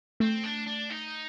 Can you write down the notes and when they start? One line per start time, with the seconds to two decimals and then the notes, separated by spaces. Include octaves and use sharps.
0.20 A3 C4
0.44 D4
0.67 D4
0.90 D#4